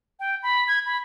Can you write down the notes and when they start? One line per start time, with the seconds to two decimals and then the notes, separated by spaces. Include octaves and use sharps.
0.20 G5
0.43 B5
0.68 G#6
0.86 B5